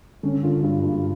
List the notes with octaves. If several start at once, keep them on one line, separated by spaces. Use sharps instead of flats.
D3 C#4
D3 F4
G2
G2